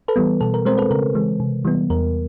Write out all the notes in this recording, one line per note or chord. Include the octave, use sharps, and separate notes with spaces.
A4 B4
E3 G3 B3
B2 A4
A#4
G#3 C4 A#4 C5
A4 B4
C#3 A#4
E3 G#3
C3
E3 G3 B3
E2 A#4